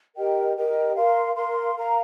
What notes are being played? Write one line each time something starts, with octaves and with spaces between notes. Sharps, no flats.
G4 A#4 D#5 G5
G4 A#4 D#5 G5
A#4 F5 C6
A#4 F5 C6
A#4 F5 A#5